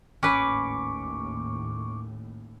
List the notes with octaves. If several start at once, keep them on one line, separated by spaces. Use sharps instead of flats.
G#1 D#2 A2 C#4 B4 C#6 D6